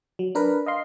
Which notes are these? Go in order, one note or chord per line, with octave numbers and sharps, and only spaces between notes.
F#3
D4 A#4 B4
D#5 F5 C6